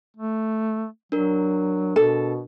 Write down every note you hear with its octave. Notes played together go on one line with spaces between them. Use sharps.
A3
F#3 D4 A#4
B2 A4